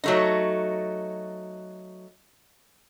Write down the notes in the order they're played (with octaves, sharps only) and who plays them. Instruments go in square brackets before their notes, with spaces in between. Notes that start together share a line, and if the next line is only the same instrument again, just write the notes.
[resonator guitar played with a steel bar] F#3 A3 D#4